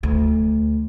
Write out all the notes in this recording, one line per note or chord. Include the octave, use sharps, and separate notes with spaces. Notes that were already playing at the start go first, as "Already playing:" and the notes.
D2